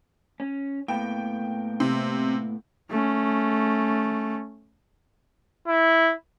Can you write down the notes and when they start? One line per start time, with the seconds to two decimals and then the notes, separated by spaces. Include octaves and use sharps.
0.40 C#4
0.88 A2 A#3 B3 G5
1.80 C3
2.90 A3 C#4
5.67 E4